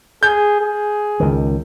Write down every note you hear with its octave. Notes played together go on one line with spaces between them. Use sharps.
G#4 G6
G#4
C#2 D#3